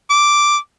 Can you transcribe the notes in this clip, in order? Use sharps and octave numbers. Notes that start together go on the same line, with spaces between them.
D6